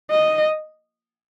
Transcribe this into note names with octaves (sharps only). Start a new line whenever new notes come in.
D#5